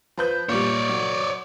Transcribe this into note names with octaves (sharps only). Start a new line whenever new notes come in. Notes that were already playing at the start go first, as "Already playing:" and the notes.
F3 B4 G6
A#2 G3 C#5 D5
F#3